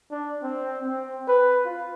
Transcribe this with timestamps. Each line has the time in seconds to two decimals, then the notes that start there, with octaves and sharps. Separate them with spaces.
0.11 D4
0.43 C4
0.84 C4
1.28 B4
1.66 F4